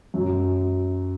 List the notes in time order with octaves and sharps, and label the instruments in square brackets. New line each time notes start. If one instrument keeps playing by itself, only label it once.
[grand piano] F#2